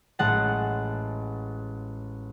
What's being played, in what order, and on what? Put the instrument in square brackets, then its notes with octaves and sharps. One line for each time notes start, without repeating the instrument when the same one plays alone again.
[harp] A1 G#3 F#5 A5